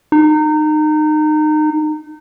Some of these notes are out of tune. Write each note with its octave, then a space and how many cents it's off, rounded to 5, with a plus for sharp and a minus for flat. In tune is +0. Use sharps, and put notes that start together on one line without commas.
D#4 -25